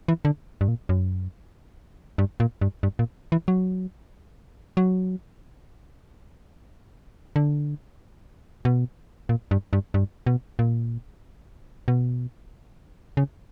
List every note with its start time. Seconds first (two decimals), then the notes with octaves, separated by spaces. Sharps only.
0.08 E3
0.25 D3
0.61 G2
0.68 A#2
0.89 F#2
2.18 G2
2.40 A#2
2.61 G2
2.83 G2
2.99 A#2
3.32 E3
3.48 F#3
4.77 F#3
7.36 D3
8.65 B2
9.29 A#2
9.51 G2
9.73 G2
9.94 G2
10.26 B2
10.59 A#2
11.88 B2
13.17 C#3